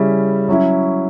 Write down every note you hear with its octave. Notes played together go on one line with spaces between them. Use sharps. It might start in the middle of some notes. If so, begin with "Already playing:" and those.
Already playing: C#3 G3 C#4 E4
F#3 C#4 E4